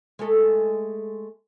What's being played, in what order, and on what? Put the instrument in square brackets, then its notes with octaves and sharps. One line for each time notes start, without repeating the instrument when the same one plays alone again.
[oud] G#3 A3 A4